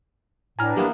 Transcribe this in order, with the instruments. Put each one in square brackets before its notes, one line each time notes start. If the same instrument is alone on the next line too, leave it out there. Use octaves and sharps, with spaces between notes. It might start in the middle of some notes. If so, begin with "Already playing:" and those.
[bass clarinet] A2 [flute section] D4 B4 [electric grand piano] G#5 A#5 F6
[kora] E3 A#3 B3 [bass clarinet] G4